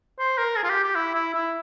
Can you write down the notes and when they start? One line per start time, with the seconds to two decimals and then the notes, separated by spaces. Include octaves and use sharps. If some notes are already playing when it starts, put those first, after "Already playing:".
0.19 C5
0.38 A#4
0.57 G#4
0.64 F4
0.70 G4
0.83 G4
0.95 E4
1.15 E4
1.34 E4